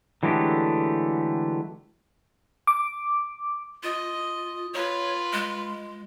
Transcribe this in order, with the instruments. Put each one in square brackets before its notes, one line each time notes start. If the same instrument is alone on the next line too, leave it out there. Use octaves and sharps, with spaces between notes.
[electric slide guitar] D3 E3 F#3 G#3 A3 G4
[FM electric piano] D6
[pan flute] F4 [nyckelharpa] D#5
[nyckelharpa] F4 B4 [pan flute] C#5
[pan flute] G#3